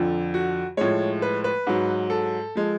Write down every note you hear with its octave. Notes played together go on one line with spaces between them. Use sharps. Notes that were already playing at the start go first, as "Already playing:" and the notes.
Already playing: F2 D3 F3
F#4
A2 F3 G#3 C#5
B4
B4
G#2 F#3
A4
F3 G#3